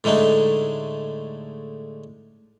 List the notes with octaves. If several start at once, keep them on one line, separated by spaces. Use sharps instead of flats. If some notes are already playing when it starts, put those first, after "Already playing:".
A2 D3 G#3 A3 D#4